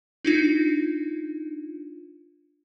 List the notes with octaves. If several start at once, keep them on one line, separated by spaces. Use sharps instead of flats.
D4 D#4 F4